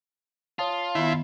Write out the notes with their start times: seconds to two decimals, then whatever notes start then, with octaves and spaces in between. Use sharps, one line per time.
0.59 F4 C#5 F5 A5 D#6
0.95 D#3 B3 E4